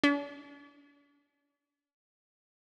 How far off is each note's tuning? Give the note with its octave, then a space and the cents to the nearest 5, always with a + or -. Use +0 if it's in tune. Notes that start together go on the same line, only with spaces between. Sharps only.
D4 -45